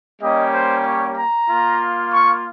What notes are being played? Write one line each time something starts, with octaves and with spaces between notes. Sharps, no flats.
G3 A#3 C#4 G4 D#5
C5
C#5
A#5
A#3 F4
C#6